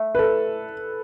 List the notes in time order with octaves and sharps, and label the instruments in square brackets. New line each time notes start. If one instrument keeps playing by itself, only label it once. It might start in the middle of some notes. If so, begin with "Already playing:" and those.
Already playing: [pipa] A3
[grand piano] B4
A4